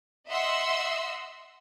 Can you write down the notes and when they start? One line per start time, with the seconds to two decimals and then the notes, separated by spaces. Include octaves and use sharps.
0.28 D#5 E5 F#5 C6 E6